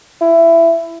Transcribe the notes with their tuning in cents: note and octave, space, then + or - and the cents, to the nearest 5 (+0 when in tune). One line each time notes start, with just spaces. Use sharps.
E4 +15